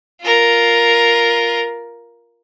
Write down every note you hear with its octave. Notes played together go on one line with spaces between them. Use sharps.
F4 A#4